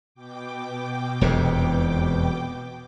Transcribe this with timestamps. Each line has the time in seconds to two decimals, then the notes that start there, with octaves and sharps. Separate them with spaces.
0.14 B2 G5 D6
1.21 E1 F2 C3